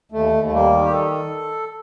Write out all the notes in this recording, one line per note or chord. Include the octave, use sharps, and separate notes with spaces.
D#2 A3
D#2
A3
G3 A#3
D#3
G4
A4